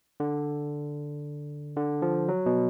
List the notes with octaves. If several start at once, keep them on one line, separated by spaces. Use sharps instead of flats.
D3
D3
F3
F#3
B2